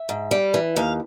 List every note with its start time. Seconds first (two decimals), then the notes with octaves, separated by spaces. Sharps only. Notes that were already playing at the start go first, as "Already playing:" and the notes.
Already playing: E5
0.09 G#2
0.31 G3
0.54 E3
0.76 D#2 F5